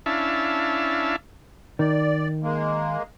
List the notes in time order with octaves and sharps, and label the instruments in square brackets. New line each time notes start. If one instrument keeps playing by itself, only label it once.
[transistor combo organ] C#4 D4 E4 E5 F5 A5
[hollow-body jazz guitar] D#3 [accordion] D5
[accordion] G#3 A#3